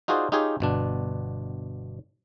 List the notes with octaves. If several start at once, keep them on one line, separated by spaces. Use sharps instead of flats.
D#4 F4 F#4 G#4 C5 D5
D#4 F4 G4 G#4 C#5
G1 B2 D4